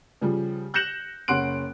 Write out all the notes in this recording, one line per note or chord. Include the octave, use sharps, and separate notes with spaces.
C#3 F3 G3
F#6 G6 A#6 C#7 E7 F#7
F#1 C#4 F#5 C6 F#6 D7